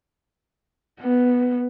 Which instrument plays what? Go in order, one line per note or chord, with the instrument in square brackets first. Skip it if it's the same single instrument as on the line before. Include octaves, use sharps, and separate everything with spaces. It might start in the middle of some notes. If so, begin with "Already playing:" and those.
[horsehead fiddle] B3